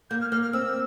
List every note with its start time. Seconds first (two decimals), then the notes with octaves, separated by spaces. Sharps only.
0.10 A#3 G6
0.21 F6
0.32 A#3 F6
0.43 F6
0.53 C4 E6